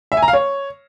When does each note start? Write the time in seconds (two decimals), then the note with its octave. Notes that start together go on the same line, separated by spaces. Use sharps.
0.12 E5
0.17 G#5
0.22 A#5
0.28 F5
0.33 C#5